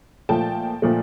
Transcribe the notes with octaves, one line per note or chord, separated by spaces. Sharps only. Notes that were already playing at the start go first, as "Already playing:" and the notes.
A#2 F3 A3 G5 A5
A#2 F3 A3